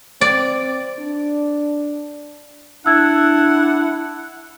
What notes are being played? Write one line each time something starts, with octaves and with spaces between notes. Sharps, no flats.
C4 D5
D4
D4 E4 F#5 E6 G#6